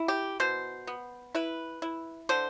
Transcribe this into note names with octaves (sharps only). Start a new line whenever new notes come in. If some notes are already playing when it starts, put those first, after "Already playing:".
Already playing: E4
G4
B2 C5
B3
E4 B4
E4
D3 C5